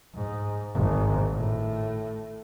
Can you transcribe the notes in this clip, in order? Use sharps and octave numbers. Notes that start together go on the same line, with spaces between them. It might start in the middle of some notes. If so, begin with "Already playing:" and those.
G#2
G#1
A2